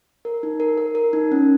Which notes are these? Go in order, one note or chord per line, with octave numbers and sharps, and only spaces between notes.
A#4
D#4
A#4
A#4
A#4
D#4
C#4